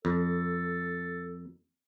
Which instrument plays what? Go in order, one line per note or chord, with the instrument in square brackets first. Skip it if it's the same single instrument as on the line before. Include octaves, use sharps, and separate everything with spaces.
[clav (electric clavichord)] F2 [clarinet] A4